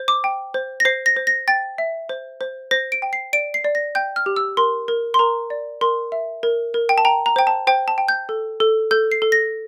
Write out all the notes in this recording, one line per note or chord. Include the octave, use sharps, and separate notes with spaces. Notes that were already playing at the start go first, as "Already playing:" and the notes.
Already playing: C5
D6
G5
C5
A#6
C5 C7
A#6
C5
A#6
G5 A6
E5
C5
C5
C5 A#6
D7
G5
C7
D5 D7
C7
D5
A#6
G5 G6
F6
G4
E6
A#4 C6
A#4
C6
A#4 A#5
D5
A#4 C6
E5
A#4
A#4
G5
A5
G5 A#5
A#5
C5 G5
A5
C5 G5
A5
G5
G6
A4
A4
A4 G6
C7
A4
A#6